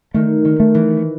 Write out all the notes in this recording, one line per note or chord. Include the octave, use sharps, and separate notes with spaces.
D#3 A3
D#3
A3
E3